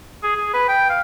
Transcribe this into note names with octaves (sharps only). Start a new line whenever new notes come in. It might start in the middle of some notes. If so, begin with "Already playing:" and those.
G#4
G#4
B4
G5
F5